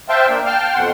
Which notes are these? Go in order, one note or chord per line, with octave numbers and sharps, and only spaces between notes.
C5 E5 F5 G5 A5
A#3 D4
F5 G5 A5 F6
F2 B2 F#5 C6